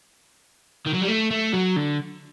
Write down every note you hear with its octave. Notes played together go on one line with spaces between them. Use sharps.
D#3
F#3
G3
A3
A3
F#3
D3